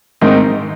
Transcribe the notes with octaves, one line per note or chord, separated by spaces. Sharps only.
G#2 D#3 C4 D#4